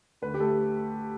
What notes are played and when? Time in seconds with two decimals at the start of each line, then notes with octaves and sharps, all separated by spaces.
0.22 D2 B4
0.34 G4
0.40 A3 A4